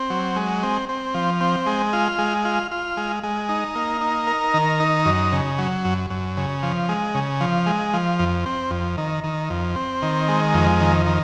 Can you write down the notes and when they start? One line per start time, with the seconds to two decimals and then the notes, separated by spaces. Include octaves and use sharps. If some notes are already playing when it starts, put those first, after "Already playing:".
Already playing: C4
0.10 F#3
0.36 G#3
0.63 C4
0.89 C4
1.14 F3
1.41 C4
1.67 G#3
1.93 F4
2.18 G#3
2.45 F4
2.71 F4
2.97 G#3
3.23 G#3
3.49 D#4
3.75 A#3
4.01 D#4
4.27 A#4
4.54 D#3
4.80 D#4
5.05 F#2
5.32 C#3
5.58 F#3
5.85 F#2
6.10 F#2
6.37 C#3
6.63 F3
6.89 G#3
7.15 C#3
7.40 F3
7.66 G#3
7.93 F3
8.19 F2
8.46 C4
8.71 F2
8.97 D#3
9.24 D#3
9.50 F2
9.76 C4
10.02 D#3
10.28 G#3
10.54 F2
10.80 D#3
11.06 D#3